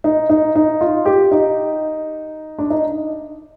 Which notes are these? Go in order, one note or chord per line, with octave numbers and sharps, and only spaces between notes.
D#4
D#4
D#4
F4
G4
D#4
D4
D#4